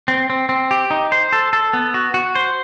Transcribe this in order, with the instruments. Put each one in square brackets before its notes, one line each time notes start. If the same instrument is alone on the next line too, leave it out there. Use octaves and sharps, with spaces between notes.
[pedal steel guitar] C4
C4
C4
G4
D#4
C5
A4
A4
B3
F#4
F#4
C5